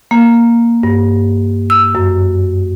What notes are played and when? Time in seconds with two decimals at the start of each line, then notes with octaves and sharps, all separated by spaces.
0.11 A#3
0.83 G2
1.70 E6
1.95 F#2